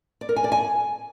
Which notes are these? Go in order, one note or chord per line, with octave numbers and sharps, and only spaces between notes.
D5
A#4
G#5
D5
G#5